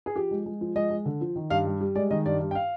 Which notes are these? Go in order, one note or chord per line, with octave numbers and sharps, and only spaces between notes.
G#4
F3 G4
G#3
G#3
F3
G#3 D#5
G#3
D3
F3
D#3
G2 F5
G3
G3
G#3 D5
D#3 D#5
G2 D5
G2
G5
F5